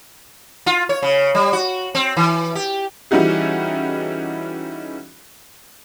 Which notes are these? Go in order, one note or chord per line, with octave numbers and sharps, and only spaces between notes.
F4
C#5
C#3
G3
F#4
C4
E3
G4
E3 G3 C#4 D#4 F#4 G#4